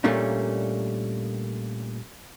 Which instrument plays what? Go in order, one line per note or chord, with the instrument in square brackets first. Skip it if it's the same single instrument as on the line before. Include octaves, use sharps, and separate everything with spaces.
[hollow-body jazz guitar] A#2 G3 A3 A#3 C#4 D4